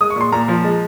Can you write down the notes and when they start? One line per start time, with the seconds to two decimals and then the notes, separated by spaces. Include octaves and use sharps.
0.01 G#3 D#6
0.10 C#6
0.16 A#2 C6
0.32 A#2 A#5
0.48 F3
0.64 G#3